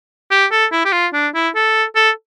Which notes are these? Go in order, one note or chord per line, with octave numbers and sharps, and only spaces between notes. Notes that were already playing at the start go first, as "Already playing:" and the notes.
G4
A4
E4
G4
F4
D4
E4
A4
A4